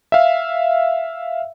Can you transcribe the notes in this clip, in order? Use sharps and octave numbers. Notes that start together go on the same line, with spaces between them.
E5 F5